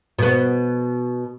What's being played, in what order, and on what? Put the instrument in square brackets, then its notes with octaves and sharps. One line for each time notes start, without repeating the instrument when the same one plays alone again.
[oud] B2 B3